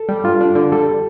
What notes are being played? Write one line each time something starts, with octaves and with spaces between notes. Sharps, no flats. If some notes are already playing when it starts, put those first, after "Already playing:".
Already playing: A4
G3
G2 F4
D4
D3
G3 A4